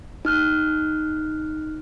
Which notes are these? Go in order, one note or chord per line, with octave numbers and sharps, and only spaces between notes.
D#4 F6 F#6